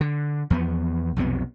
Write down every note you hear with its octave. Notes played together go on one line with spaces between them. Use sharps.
D3
E2 F3 B3
B1 F2 C3 B3